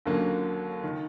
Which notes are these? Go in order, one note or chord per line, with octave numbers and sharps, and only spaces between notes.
D#2 D3 F#3 A#3 C#4
D#3